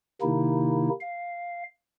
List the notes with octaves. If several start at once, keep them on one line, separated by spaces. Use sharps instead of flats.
C3 D#3 A#3 D#4 E4
F5